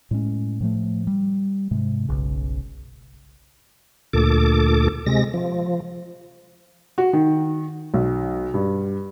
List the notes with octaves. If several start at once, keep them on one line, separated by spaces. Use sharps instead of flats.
A2 G#3 C#4
A2 F3 A3
G3
G#2 C3 G#3
F#1 B1 C#3
D2 A#2 A4 D6
C3 G#3 A#6
F3
F#4
D#3
B1
G2